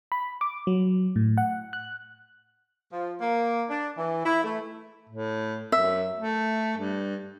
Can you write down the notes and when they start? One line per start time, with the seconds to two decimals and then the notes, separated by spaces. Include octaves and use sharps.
0.12 B5
0.41 D6
0.67 F#3
1.16 A2
1.38 F#5
1.73 F#6
2.91 F3
3.20 A#3
3.69 D4
3.96 E3
4.23 E4
4.42 A3
5.09 A2
5.72 F#2 E5
6.17 A3
6.78 G2